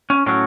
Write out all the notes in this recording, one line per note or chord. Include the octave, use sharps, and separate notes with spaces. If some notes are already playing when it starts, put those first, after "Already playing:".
C#4
A2 F#3 C#4